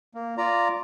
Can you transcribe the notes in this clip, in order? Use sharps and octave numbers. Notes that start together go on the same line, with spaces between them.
A#3
F4 D5 A#5